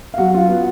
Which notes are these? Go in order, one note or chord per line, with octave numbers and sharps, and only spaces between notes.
F5
F#3 F#4 F#5
F4
B3